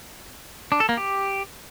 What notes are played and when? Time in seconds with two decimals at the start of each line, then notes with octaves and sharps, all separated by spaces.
0.72 D4
0.80 A4
0.89 A#3
0.97 G4